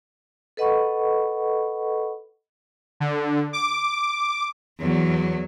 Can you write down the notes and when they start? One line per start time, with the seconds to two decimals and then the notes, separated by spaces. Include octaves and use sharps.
0.57 A4 B4 D#5 F#5 B5 C#6
3.00 D3
3.53 D6
4.81 E2 F#3